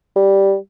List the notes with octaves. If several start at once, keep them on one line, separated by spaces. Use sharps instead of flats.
G3